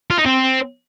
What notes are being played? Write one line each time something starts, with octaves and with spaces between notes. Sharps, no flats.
F4
D#4
C4